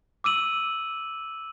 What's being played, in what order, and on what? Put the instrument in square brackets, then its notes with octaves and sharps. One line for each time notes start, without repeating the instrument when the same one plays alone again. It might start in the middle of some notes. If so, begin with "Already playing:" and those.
[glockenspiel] D6 E6 D#7 F#7